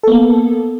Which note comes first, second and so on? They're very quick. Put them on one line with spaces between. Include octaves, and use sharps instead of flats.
A4 B3 A#3